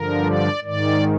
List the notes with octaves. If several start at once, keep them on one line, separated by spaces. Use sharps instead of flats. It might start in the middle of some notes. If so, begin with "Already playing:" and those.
Already playing: G2 D3 F3 A#4
D5
G#2 D#3 D5